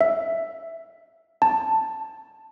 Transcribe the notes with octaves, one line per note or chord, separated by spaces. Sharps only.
E5
A5